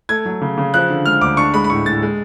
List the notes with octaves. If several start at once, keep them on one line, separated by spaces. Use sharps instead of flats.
A3 G#6
F#3
C#3
C#3
F3 F#6
D3
G#3 F6
D2 D6
D4 C#6
G#3 B5
B5
A2 C#6
A2 A6
G#3